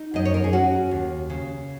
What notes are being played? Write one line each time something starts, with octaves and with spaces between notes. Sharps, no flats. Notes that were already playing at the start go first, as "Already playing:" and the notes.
Already playing: D#4
F#2 D#5
C#5
A#4
G#4
C#4 F#4
D#2
C#3